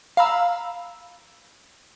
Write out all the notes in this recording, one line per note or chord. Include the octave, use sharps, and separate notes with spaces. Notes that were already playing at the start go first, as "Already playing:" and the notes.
F5 A#5 B5 E6